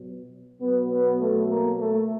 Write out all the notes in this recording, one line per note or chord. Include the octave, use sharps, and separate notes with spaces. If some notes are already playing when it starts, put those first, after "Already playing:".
Already playing: B2 F#3
B2 F#3 B3
B3
A3
A#3
A3